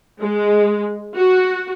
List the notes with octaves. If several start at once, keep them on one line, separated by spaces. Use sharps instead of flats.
G#3
F#4